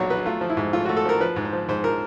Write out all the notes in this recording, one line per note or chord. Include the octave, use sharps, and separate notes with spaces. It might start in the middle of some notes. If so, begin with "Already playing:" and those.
Already playing: B1 A#2 F#3 C#5 D5
F#3 B4
A3 F4
F3
E4
G#2
A3 F4
A3 F#4
A4
F3 A#4
F3 B4
G#2
C5
F3
G#2 C5
F3 A#4